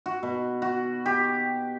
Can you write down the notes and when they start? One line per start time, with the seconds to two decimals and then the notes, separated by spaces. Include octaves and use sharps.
0.06 F#4
0.23 B2
0.62 F#4
1.06 G4